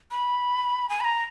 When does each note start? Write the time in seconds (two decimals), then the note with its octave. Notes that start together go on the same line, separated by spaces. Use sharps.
0.11 B5
0.89 G#5
1.00 B5
1.04 A#5